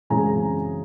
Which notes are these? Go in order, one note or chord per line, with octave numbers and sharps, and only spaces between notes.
F#2 C#3 E3 G#3 C4 G#5 A#5